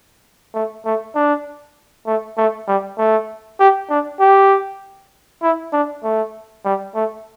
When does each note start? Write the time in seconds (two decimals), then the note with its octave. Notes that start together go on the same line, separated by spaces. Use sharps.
0.54 A3
0.85 A3
1.15 D4
2.06 A3
2.37 A3
2.67 G3
2.98 A3
3.59 G4
3.90 D4
4.20 G4
5.42 E4
5.73 D4
6.04 A3
6.65 G3
6.95 A3